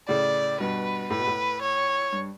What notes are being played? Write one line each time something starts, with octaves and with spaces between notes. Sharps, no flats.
A2 C#3 D5
G2 B2 B4
A2 B4
B2
A2
C#5
G2